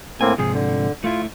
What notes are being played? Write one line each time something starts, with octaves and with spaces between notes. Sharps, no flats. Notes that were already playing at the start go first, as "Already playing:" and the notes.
A2 A#3 C4 G#5
G#2 C3 F3 G#4
D3
A3 E4 F4